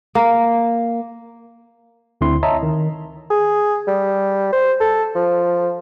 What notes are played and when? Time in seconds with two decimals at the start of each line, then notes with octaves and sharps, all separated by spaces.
0.15 A#3
2.21 D2 D3 C4 E4 C6
2.43 C#5 D#5 E5 A5 A#5
2.63 D#3
3.31 G#4
3.87 G3
4.52 C5
4.80 A4
5.15 F3